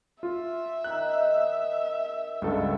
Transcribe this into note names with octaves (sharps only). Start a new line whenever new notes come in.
F4 E5
D#3 D#4 F#6
C#2 G2 B2 A4